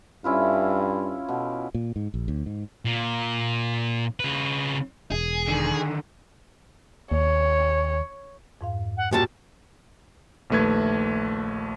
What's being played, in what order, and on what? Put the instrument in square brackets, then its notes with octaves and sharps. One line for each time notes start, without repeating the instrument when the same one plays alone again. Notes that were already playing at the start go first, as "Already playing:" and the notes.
[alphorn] G2 [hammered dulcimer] C#4 E4 F4
[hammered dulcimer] B2
[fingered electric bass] A#2
G#2
A#1
D2
G#2
[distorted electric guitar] A#2
C#3 B4
[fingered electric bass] E1 [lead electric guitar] G#4
[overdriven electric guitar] D3 D#3
[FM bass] D#2 [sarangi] C#5
[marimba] F2 G#2 F5
[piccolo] F#5
[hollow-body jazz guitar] A#2 F#3 G3 [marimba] F#4 [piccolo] A5
[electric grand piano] A#1 D#2 A3 B4 G#6